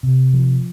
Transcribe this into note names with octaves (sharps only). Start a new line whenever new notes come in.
C3
F3